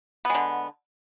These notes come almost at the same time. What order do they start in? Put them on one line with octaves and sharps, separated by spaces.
B3 G#3 D3